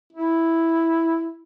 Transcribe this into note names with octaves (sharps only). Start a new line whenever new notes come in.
E4